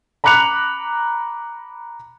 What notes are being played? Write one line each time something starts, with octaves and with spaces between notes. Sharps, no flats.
A#5 B5 D6 F#6 C#7 F7